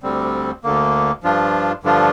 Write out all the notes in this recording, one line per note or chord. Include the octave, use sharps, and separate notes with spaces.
D2 D3 G3 C4
D2 D3 A#3
G2 F3 D4 F4
G2 D3 F3 D4 F4